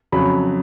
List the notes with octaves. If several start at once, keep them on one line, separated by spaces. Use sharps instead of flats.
F2 C#3 F#3 B5